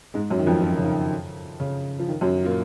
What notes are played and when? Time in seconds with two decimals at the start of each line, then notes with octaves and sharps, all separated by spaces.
0.14 G#2 G#3
0.30 F#2 F#3
0.39 D#3
0.47 F2 F3
0.62 F3
0.70 D#3
0.77 C#3
0.84 D#3
1.60 C#3
1.99 F3
2.09 D#3
2.21 F#2 F#3
2.44 A#2 A#3